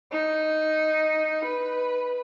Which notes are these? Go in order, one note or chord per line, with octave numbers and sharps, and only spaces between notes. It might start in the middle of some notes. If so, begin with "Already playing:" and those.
D#4
B4